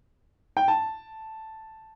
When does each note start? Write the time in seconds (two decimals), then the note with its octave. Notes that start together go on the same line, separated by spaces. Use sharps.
0.57 G5
0.68 A5